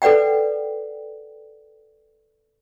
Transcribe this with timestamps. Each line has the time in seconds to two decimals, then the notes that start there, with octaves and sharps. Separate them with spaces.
0.02 A4 B4 D5 F#5 G5